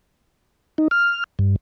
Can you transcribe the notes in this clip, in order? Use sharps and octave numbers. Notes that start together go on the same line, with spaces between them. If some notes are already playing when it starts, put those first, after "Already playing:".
D#4
F6
G2